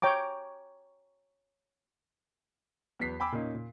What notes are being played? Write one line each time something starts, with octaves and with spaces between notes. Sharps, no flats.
C#5 G5 A#5 D6
E2 F#3 B3 B6 C7
G5 G#5 B5 D6 E6
A#2 A#3 C#4 D#4
A#2